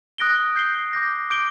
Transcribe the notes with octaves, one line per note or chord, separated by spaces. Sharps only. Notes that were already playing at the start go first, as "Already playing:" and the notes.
D#6 F#6 A#6 D7 G7
G6 C7 G7
D6 G6 A#6
D6 G6 D7 G7